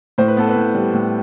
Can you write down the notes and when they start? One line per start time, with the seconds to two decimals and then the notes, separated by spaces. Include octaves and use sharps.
0.18 A2 C5
0.28 B4
0.37 B3 A4
0.48 B4
0.56 A2
0.75 G3
0.93 A2